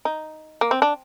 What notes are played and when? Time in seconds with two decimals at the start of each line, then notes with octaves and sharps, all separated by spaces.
0.05 D#4
0.61 A#3
0.71 C4
0.82 D4